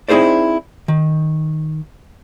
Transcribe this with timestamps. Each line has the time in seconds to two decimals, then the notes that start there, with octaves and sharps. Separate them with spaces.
0.08 C4 D#4 E4 G#4 C5 D5
0.88 D#3